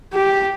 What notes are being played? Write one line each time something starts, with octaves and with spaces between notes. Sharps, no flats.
G4